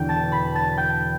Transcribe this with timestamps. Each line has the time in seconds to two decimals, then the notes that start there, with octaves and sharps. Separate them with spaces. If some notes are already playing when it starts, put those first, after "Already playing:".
Already playing: E1 E2 D3 D4 G5 G6
0.09 A5 A6
0.32 B5 B6
0.55 A5 A6
0.77 G5 G6